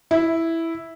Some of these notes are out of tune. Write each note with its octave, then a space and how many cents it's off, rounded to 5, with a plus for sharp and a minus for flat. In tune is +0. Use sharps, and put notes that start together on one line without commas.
E4 +0